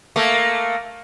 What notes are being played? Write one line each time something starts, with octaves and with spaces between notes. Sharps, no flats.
A3 A#3